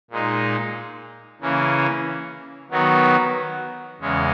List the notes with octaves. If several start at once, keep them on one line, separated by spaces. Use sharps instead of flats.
A#2 G#3 D#4
C#3 E3 A#3 C#4
D#3 F#3 B3 F#4
E2 C#3 G#3 C#4